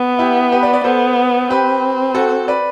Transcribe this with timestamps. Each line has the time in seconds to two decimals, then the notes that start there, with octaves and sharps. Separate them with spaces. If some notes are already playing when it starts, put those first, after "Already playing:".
Already playing: B3
0.19 E4 G4
0.52 G4 B4
0.63 B4 D5
0.73 B4 D5
0.84 B3 A4 C5
1.49 C4 G4 B4
2.15 F#4 A4
2.48 B4 D5